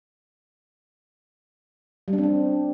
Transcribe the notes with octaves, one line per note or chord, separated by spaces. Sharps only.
G3
D4
C4
D4